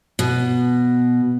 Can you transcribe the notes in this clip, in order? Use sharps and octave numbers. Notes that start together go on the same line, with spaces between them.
B2